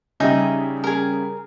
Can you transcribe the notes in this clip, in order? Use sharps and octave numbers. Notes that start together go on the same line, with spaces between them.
C#3 G3 D#4 G#4 E5
G#4 A#4